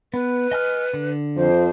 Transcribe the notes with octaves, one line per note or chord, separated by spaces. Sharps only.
B3 B4
D#5 G#5 F6
D3
F2 F3 C5